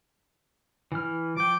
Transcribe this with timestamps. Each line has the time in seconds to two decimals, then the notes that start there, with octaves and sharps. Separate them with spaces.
0.92 E3 F6
1.37 F3 G5 D6